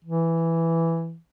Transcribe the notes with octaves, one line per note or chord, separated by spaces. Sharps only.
E3